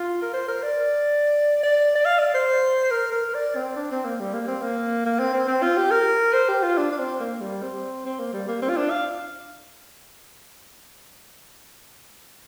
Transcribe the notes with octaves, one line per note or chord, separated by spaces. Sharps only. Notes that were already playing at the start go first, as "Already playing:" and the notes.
Already playing: F4
A#4
C5
A#4
D5
D5
D5
F5
D5
C5
A#4
A#4
D5
C4
D4
C4
A#3
G3
A#3
C4
A#3
A#3
C4
C4
C4
F4
G4
A#4
C5
G4
F4
D4
D4
C4
A#3
G3
C4
C4
A#3
G3
A#3
C4
F4
D4
F5